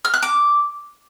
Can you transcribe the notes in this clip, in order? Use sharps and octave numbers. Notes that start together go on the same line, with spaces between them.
F6
F#6
D6